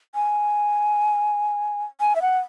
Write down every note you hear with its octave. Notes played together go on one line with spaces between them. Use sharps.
G#5
G#5
E5
F#5